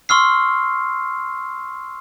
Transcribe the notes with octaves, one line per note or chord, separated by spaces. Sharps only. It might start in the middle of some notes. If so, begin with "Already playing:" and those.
C6 C#6 E6 F6 C7